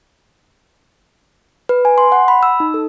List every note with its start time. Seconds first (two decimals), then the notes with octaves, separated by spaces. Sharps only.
1.69 B4
1.85 G#5
1.98 C6
2.12 F#5
2.28 B5
2.43 E6
2.60 D#4
2.74 A4